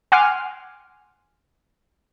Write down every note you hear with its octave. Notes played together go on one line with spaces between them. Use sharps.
F#5 G#5 C6 D6 F6